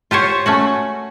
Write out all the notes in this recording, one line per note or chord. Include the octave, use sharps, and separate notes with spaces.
F4 G4 C5 C#5
A3 C#4 F#4